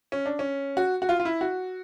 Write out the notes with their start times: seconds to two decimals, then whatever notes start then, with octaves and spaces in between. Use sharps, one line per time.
0.12 C#4
0.26 D4
0.39 C#4
0.77 F#4
1.02 F#4
1.09 F4
1.20 F4
1.25 E4
1.41 F#4